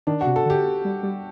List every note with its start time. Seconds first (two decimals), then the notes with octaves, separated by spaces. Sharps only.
0.07 D#3 D4
0.21 F#4
0.27 C3
0.36 A4
0.46 D3
0.50 G4
0.85 G3
1.03 G3